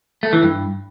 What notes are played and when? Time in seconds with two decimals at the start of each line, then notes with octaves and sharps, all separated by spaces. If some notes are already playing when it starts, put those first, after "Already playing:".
0.23 A3
0.33 E3
0.43 G2